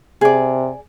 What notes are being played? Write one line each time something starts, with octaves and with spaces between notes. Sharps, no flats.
C3 G#4 D5